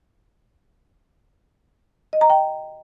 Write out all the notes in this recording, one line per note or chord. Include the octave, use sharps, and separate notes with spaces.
D#5
A#5
G5